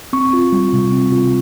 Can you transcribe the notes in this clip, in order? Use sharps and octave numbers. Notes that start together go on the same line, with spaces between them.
C4 C#6
F4
G3
C3
C4
F4